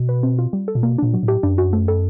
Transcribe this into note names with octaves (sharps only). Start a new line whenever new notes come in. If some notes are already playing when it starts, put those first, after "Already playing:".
Already playing: B2
B4
C4
F4
G3
A4
A#2
B2 A#3
A#2 D4
F#3
A2
G4
F#2 D4
F#4
A3
A4